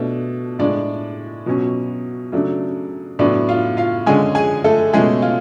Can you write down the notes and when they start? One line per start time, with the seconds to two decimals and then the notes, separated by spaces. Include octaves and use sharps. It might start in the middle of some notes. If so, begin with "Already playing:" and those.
Already playing: B2 A3 D4
0.59 A2 G#3 D4 D5
1.46 B2 F#3 C#4
2.32 C#3 F#3 A3 D4
3.19 A2 F#3 B3 D4 D5
3.48 F4 F5
3.77 F4 F5
4.06 D3 G#3 C#4 G#4 G#5
4.35 G#4 G#5
4.64 A3 A4
4.93 B2 G#3 A3 C#4 G#4
5.22 F4